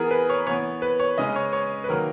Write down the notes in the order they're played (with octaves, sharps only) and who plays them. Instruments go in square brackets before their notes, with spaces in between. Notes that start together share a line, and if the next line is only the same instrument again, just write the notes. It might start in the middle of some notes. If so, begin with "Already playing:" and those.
Already playing: [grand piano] E3 B3 G#4 A#4
B4
C#5
E3 B3 C#5
B4
C#5
C#3 G#3 C#4 D#5
C#5
C#5
B4
D#3 F#3 A#3 A#4